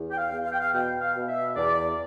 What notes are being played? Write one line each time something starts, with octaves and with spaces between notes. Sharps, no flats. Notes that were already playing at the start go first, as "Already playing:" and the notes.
Already playing: E2
G5
F5
E2
F5
G5
F5
B2 G5
F5
B2
E5
E2 D5